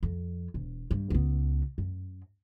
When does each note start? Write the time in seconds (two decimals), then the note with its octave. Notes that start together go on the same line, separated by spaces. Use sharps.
0.03 F2
0.54 E1
0.91 G2
1.10 C#2 B3
1.78 F#2